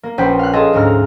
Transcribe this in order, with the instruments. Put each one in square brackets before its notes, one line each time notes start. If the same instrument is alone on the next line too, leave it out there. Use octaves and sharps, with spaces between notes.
[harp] A#3
A#1 C#4 B4 C5 G5
F5 F#6
G#4 A4 D#5 A5 C6
D2 G#2 C#4 A#5 F6